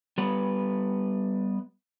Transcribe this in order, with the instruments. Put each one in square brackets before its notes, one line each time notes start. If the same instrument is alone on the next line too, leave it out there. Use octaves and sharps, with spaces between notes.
[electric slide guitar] G3 B3 B4